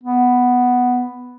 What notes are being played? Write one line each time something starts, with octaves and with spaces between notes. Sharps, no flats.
B3